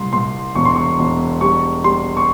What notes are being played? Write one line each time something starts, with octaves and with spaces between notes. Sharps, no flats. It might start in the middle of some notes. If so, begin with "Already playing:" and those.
Already playing: C2 C6
C2 C6
E1 C#6
C6
C#6
E1
G3 C#6
G3 C6
C#6